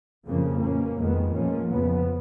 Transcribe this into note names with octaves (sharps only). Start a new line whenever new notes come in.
F2 C#3 F3 A#3
B2 A#3 C#4
F2 D#3 G#3 B3
G#2 F3 A#3 C#4
F2 C#3 F3 B3